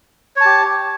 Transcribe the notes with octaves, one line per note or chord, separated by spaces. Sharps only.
G4 C#5 A5